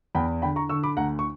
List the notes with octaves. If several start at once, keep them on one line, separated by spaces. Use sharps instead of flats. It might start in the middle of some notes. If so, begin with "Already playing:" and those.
E2 G5 B5
D3 G5 B5
A#5 C#6
D3 C#6 E6
B5 D6
D2 F#5 A#5
C#6